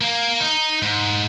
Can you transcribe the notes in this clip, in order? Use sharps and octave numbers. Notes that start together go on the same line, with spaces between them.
A#3
D#4
G#2